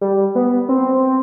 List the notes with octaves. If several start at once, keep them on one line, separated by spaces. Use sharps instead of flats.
G3
B3
C4